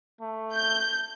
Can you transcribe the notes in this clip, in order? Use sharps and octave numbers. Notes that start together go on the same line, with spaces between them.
A3
G6